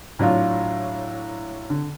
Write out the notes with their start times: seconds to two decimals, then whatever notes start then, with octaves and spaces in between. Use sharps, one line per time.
0.19 A2 F#3 D4 F4
1.70 D3